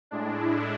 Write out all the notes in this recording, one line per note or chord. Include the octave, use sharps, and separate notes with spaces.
A2 G#3 D4
E4